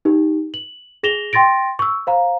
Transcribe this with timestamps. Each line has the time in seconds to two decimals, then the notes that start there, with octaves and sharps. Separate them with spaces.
0.05 D#4 G4
0.54 F#7
1.03 G#4 A#6 E7 F7 G7
1.33 G5 C6 A6 A#6 D7
1.79 C#6 E6
2.07 C5 F5 A#5